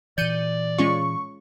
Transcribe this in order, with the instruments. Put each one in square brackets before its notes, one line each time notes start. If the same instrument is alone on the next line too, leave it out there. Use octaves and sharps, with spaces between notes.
[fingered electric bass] A#2 E3 [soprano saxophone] D5 [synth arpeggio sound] G6 C#7 D#7
[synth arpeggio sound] G#3 C#4 F4 [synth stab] C#6